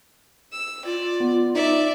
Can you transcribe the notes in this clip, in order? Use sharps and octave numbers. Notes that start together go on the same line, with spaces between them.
E6
F4 D5
B3
D#4 D5 E5